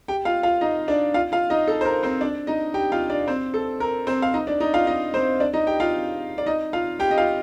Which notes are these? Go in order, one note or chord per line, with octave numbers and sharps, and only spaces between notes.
G4 G5
F4 F5
F4 F5
D#4 D#5
D4 D5
F4 F5
F4 F5
D#4 D#5
A4
C5
A#4
C4 C5
D4 D5
D#4 D#5
G4 G5
F4 F5
D4 D5
C4 C5
A4
A#4
C4 C5
F5
D#4 D#5
D4 D5
D#4 D#5
F4 F5
D#4 D#5
C4 C5
D4 D5
D#4 D#5
G4 G5
F4 F5
D5
D#4 D#5
F4 F5
G4 G5
D#5
F4 F5